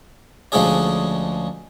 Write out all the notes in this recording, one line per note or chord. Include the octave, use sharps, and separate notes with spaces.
D2 F3 G#3 C#4 G#4 D5